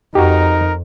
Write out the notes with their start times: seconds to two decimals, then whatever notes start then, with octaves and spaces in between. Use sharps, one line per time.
0.15 F2 D#4 F#4 G4 A#4